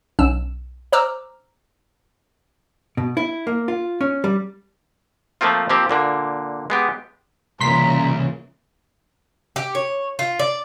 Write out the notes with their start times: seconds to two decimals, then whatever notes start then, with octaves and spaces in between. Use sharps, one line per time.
0.19 B1 C#4 E6 E7
0.92 C5 A#5 D6 E6 F6
2.97 B2
3.17 E4
3.47 A#3
3.68 F4
4.01 C#4
4.24 G3
5.41 F3 A3 A#3 C4 F4
5.70 F3 A#3 C4 G4
5.89 A#2 D3 A#3
6.70 G#3 B3 G4
7.60 C2 A#2 C#3 E3 A#5 C6 B6
9.56 G4
9.75 C#5
10.19 F4
10.39 D5